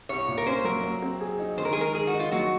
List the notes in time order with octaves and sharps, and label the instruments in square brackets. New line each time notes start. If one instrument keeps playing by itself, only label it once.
[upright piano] C2 [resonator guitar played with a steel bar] C#5
[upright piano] A#2
[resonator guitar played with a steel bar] A#4
[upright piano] C#4 [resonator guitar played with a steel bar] C5
[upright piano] F#3 [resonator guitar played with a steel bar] A#4
[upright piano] F#3
C4
G#4
D#4
[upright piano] D#3 [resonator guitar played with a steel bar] C5
[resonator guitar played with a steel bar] A#4
G#4
[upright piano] G#3 [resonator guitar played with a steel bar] A#4
[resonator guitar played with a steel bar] G#4 [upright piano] A#4
[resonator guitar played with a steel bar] F#4
[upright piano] D#4
[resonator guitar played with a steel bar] F4
[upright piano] F#3 [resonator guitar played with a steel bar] F#4